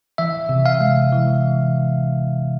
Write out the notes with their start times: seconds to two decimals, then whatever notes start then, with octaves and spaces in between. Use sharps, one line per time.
0.18 E3 E5
0.49 C3
0.66 F5
0.81 G#3
1.13 E3